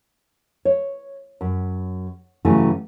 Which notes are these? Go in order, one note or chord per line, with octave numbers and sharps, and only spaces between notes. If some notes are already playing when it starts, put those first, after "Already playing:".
C#5
F#2
G2 C#3 E3 F#3 A3 G#5